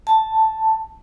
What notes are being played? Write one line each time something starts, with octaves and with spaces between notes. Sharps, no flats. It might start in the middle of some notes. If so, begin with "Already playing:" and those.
A5